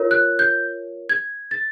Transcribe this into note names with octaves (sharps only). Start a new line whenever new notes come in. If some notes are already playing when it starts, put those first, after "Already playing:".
Already playing: F4 A#4 C#5
F#6
G6
G#6
A6